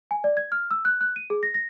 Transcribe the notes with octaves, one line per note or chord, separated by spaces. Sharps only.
G#5
D5
G#6
F6
E6
F#6
F#6
D#7
G#4
A#6
A#6